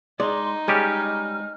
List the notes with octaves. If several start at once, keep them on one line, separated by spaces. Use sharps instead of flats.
G#3 D#4 D5 C6
G3 G#3 C#4 G4 F6